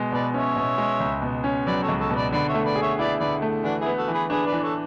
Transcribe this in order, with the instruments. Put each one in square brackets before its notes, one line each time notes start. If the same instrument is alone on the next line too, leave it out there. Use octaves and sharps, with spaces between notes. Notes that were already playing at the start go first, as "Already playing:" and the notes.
Already playing: [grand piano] B2 G#3
[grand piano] B2 [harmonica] B4 D5
[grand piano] C#4 [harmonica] C#5 E5
[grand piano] B2
G#3
C#2
B2
C#4
[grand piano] F#3 [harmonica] B4 D5
[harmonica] A4 C#5
[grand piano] C#2
[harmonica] A4 C#5
[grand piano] B2
[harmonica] B4 D5
[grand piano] D3 [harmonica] B4 D5
[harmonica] C#5 E5
[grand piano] A3
[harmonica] B4 D5
[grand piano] G#4
[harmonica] C#5 E5
[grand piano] E4 [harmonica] B4 D5
[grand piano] D3 [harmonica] B4 D5
[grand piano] A3
[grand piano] E3 [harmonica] D4 F#4
[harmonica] E4 G#4
[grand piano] B3
[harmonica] F#4 A4
[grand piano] E3
[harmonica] G#4 B4
[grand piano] D4 [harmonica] G#4 B4
[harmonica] B4 D5
[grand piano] E3
[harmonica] A4 C#5